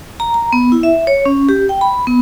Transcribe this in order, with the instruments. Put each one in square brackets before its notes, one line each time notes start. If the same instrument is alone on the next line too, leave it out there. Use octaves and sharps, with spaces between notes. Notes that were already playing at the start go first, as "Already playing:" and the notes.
[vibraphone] A#5
A#5
B3
E4
E5
C#5
C#4
G4
G5
B5
B3